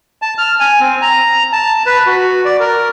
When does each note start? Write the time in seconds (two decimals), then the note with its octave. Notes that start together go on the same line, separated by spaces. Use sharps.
0.22 A5
0.38 F6
0.60 G#5
0.80 C4
1.02 A#5
1.53 A5
1.86 B4
2.07 F#4
2.45 D5
2.60 A#4